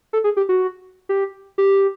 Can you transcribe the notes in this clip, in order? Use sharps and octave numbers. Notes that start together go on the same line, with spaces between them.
A4
G#4
G4
F#4
G4
G4